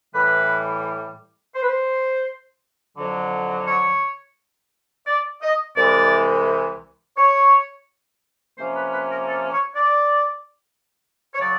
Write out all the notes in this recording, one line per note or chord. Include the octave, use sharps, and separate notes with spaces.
A2 E3 G3 B4
C5
B4
C5
F2 D3 F#3
C#5
D5
D#5
C2 C3 E3 G#3 D5
C#5
C3 F3 A#3 C#4 C5
B4
B4
A#4
A4
C#5
D5
C#5
C#3 F#3 D5